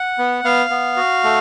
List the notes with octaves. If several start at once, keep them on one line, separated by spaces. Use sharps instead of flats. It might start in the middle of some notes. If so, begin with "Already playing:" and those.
Already playing: F#5
B3
B3 F5
B3
F#4
A3